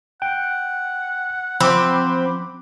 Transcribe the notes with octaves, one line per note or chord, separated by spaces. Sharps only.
F#5 G5
F3 C4 B5 D6